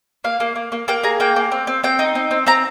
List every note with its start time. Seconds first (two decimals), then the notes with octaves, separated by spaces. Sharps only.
0.24 A#3 F5
0.40 A#3
0.56 A#3
0.72 A#3
0.88 A#3 G5
1.03 G#4 A#5
1.20 A#3 G5
1.36 A#3
1.52 C4
1.67 C4
1.84 C4 G5
1.99 D#4
2.15 C4
2.31 C4
2.46 C4 A#5